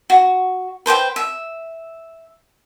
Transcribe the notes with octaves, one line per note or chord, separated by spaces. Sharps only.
F#4
B4 C5 D5 G5
E5